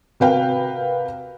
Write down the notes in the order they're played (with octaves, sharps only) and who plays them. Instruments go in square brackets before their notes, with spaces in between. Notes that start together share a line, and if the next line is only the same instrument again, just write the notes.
[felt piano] C3 F#4 A#4 B4 F5 G5